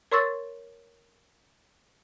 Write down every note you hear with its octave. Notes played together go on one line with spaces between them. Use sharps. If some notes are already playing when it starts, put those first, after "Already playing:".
A#4 C#5 C6 C#6 E6 A6